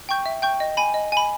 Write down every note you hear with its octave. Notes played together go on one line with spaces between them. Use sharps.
G5 C#6 G6
E5
G5 C#6 G6
D#5
G#5 B5
D#5
G#5 B5